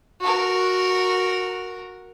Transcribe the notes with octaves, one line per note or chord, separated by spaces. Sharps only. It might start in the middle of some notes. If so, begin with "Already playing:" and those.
F#4 A#4